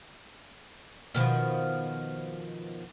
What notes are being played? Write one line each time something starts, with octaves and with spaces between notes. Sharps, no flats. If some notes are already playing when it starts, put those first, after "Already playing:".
B2 D#3 F3